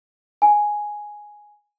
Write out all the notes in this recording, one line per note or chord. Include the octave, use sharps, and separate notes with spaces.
G#5